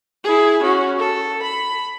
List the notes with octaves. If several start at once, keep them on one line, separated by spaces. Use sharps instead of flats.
E4 G#4
C#4 F#4
A4
B5